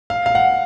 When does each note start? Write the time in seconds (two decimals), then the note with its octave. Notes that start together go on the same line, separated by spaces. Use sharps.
0.10 F5
0.26 F5
0.35 F#5